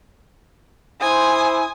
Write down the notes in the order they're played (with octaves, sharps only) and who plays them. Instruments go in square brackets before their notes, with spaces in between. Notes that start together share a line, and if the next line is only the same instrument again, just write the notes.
[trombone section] E4 C5 [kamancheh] G#5 D#6